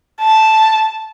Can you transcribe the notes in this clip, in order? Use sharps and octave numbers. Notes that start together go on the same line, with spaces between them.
A5